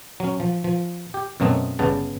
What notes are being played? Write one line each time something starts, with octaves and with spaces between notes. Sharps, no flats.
F#3 C#4
F3
F3
G4
F#2 B2 F#3 A3 C4 D#5
G1 G2 C#3 B3 A5